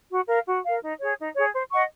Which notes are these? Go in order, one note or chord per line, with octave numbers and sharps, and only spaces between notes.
F#4
A#4 F5
F#4
A#4 F5
D#4
G#4 C#5
D#4
G#4 C#5
C5
D#5 F#5 C#6